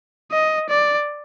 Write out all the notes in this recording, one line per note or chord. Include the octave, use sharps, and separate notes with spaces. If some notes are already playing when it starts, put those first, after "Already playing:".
D#5
D5